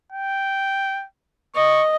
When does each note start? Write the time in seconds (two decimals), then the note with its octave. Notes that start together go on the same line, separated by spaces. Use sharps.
0.12 G5
1.55 D#5 C#6